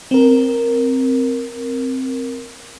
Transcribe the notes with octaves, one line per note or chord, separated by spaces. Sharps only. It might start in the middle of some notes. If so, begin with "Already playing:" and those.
C4 A#4